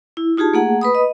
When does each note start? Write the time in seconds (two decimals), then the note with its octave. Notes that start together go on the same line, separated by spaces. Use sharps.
0.17 E4
0.37 D#4 F4 G4 G#4 A5
0.54 A3 A#3 G#4 F#5
0.81 B4 B5 D#6
0.95 D#5